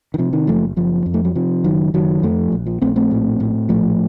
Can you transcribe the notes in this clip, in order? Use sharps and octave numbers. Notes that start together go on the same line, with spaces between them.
D#3
C3 F3
D#3
F#1 F3 A3
F#1 F3
F2
A3
F#3
C3 F3
F#1 D#3 F#3
F#1 D#3 F#3
F2 F3 A3
A#1
F3
A#1 A3 C4
A3 C4
A2
A2
A#1 F3 A3